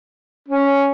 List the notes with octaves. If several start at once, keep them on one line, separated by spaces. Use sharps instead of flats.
C#4